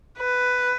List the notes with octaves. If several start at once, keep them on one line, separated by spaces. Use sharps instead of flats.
B4